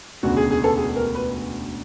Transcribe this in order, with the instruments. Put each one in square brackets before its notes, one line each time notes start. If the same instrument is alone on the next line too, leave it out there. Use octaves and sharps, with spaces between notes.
[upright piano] E1 D2 C#3 F#4
G#4
G#4
A4
G#4
A#4
B4